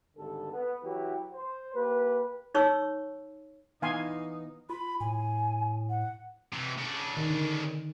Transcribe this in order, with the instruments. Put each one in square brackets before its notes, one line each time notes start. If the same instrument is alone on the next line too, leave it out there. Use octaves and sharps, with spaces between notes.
[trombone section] G#1 D3 G3 A4
B3
E3 F#3 E4 F#4 G4
C5
A#3 G4 B4
[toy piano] D#4 C#5 C#6 E6
[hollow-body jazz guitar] E3 B3 [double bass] D#4 [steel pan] F5 G#5 C6
[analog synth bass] F4 [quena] B5
[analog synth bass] A2 [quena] G#5
[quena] F#5
[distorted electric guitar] C3 E3
C#3 D4
[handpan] D#3
D3